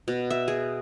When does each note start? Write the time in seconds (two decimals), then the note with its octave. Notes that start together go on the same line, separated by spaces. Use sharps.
0.08 B2
0.30 E5
0.48 G#4